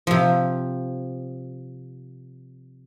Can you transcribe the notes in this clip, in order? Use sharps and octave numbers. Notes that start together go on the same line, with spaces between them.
C3 F3